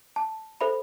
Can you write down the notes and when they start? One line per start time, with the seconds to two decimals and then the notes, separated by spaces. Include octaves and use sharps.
0.16 A5
0.61 A4 C5 E5 B5